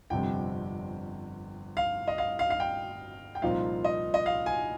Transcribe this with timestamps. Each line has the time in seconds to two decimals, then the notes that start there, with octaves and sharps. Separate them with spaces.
0.10 G1 F2 C3 G3 G5
1.77 F5
2.07 D#5
2.18 F5
2.39 F5
2.50 F5
2.60 G5
3.35 G5
3.42 C2 A#2 F3 C4 D#4 F5
3.84 D#5
4.14 D#5
4.26 F5
4.46 G#5